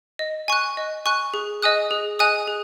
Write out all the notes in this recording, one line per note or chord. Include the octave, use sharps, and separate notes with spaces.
D#5
G#5 C#6 F#6
D#5
G#5 C#6 F#6
G#4
D#5 G#5 D#6 F#6
G#4
D#5 G#5 D#6 F#6
G#4